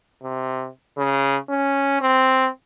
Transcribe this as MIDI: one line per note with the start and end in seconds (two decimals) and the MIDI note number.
0.23 0.69 48
0.98 1.37 49
1.49 1.99 61
2.01 2.49 60